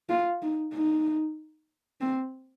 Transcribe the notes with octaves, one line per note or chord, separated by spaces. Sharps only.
F4
D#4
D#4
C4